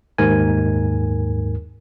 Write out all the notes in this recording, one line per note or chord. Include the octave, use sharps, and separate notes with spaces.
D#2 G#2 A#4 G#5